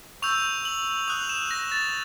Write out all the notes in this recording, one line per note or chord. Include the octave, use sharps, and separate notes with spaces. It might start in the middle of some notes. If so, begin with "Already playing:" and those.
C#6 E6 G6 F7
F#7
D#6 F#6 F7
E7
A#6
A6